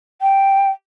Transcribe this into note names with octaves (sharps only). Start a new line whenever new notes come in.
G5